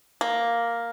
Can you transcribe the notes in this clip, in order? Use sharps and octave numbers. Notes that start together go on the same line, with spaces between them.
A#3